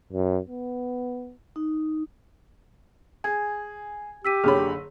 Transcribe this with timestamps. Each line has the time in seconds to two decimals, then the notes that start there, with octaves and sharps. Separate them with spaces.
0.12 F#2
0.48 B3
1.56 D#4
3.24 G#4 G#5 G#6
4.25 G4 E6 B6 D#7
4.44 F#1 D3 G#4 C#5 B5